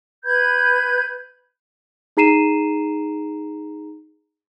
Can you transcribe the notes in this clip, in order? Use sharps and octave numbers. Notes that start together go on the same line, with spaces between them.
B4 B5 G6 G#6
D#4 G#4 A#5 C7 D#7 E7